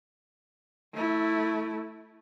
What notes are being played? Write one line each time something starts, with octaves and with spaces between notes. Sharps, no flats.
A3 E4